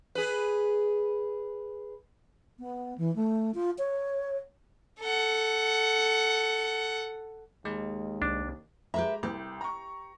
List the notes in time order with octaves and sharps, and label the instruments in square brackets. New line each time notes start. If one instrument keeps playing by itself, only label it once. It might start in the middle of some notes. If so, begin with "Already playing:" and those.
[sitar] G#4 B4
[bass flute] B3
E3
A3
F4
C#5
[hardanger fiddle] A4 F#5
[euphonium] D#2 [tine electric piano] G#3
[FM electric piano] C2 [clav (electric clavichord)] D4
[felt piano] G#3 A#5 [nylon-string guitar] G4 B4 E5
[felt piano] C2 [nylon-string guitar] G4
[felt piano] A#5 C#6